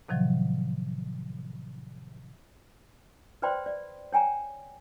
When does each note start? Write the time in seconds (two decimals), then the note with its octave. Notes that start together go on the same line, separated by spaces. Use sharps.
0.08 A2 C3 D#3 F3 F#3
3.42 B4 C5 D5 G5 B5 C6
3.66 D5
4.13 C#5 G5 G#5 A#5